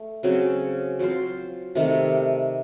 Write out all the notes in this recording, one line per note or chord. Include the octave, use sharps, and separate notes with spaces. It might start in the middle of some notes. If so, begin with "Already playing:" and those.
Already playing: A3
C#3 F#3 C4
F#3 C4 F4 C5
C3 D#3 A3